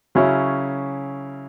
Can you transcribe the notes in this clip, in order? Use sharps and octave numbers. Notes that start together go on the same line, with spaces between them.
C#3 F#3 C#4 E4